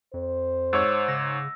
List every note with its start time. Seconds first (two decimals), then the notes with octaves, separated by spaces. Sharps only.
0.14 F2 C5
0.73 G#2 C#5 E6
1.08 C#3 A#6